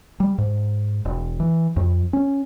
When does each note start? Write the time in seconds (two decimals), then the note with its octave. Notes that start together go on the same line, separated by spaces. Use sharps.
0.20 G3
0.38 G#2
1.05 E1
1.40 E3
1.77 F2
2.13 C#4